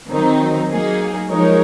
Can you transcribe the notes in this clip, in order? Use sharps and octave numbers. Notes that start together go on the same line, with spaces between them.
D#3 F#3 C4 D#4
F#3 A#3 D#4 G#4
F3 G#3 D#4 A#4 C#5